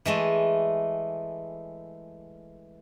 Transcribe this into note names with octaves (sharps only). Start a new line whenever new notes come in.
E3 G#3 A3